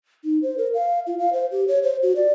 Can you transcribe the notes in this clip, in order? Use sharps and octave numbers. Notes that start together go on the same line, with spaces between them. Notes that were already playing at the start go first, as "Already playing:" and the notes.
D#4
C5
A#4
F5
F4
F5
C5
G4
C#5
C5
F#4
D5